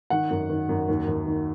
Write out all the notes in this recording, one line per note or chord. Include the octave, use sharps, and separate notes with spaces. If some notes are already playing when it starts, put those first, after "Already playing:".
D#3 F#5
F#2
D#3
F#2
D#2
D#2
D#3